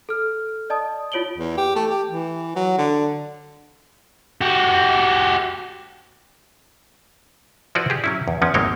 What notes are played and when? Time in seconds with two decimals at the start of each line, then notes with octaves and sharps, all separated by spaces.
0.09 A4 F6
0.70 D5 D#5 A5 D#6
1.12 E4 F4 C#5 D7 F#7 G7
1.38 E2
1.58 G4
1.76 A3
1.90 G4
2.09 E3
2.56 F#3
2.78 D3
4.41 F#4 G4
7.75 F3 E4 F#4 B4 C5 D5
7.90 G4 G#4
8.04 F#3 C#4 E4
8.28 E2
8.42 E2 F3 B3 C#4
8.54 G#1 G#3 A#3 C4 C#5 G5